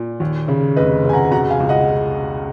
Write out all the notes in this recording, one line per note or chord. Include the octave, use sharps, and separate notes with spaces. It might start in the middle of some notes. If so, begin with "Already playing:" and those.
Already playing: A#2
D#2
C#3
F1 B4 D#5
C#3 G#5
F#5 A#5
B2 F#5 A#5
F5 G#5
C#2
D#5 F#5